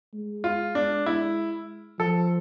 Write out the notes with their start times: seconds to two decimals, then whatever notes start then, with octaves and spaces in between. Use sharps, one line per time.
0.14 G#3
0.44 F4
0.75 D4
1.06 E4
1.99 F3 A4